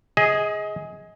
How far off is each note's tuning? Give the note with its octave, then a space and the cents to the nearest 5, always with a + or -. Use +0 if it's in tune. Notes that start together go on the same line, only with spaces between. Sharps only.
G#4 +0 D#5 +25